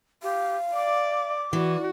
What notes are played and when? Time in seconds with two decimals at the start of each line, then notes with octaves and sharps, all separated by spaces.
0.23 G4 F5
0.75 D5 D6
1.53 E3 F#4 D5